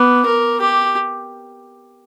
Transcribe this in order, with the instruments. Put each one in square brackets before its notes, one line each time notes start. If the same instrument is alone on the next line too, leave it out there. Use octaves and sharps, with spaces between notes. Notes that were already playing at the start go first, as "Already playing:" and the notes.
Already playing: [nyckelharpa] B3 [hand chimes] D6
[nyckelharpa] A#4
G4